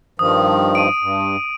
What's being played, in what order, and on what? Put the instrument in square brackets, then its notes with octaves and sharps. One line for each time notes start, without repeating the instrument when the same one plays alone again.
[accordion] G2 D#3 F3 [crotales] D#6
[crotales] D7 D#7
[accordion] G2